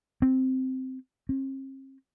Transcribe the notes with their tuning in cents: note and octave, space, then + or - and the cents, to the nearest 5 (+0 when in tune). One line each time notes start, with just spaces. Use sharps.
C4 -5
C4 +45